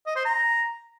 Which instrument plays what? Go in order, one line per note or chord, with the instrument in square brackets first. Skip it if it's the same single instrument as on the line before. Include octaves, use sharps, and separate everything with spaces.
[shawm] D#5
C5
A#5